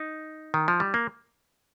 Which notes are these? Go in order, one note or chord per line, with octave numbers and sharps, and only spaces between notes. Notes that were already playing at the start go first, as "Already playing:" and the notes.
Already playing: D#4
D#3
F3
G3
A#3